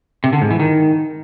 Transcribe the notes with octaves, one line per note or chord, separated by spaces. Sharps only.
C3
D3
G#2
E3
D#3